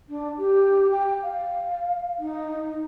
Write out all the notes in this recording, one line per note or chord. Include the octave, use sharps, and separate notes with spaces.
D4
G4
G5
F5
D#4